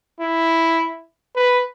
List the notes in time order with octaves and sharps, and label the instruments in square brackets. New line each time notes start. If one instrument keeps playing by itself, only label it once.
[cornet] E4
B4